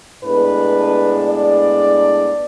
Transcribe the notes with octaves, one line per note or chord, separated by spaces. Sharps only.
A2 G#3 B3 D4 B4
D5